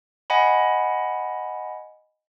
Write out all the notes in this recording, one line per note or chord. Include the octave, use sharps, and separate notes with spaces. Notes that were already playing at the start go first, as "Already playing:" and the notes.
D#5 F#5 G#5 B5